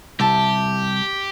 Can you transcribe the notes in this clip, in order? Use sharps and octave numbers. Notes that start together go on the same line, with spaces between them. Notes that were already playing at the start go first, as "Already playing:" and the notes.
C2 G4 E5 A5